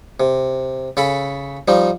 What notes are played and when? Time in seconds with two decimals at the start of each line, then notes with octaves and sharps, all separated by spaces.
0.20 C3
0.97 C#3 A4 B5
1.68 F3 G3 D#4